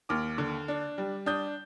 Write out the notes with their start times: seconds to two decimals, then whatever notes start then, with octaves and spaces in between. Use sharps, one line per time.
0.09 D#2 D6 F6
0.38 D3
0.68 D4
0.98 G3
1.26 D4 D#6 G6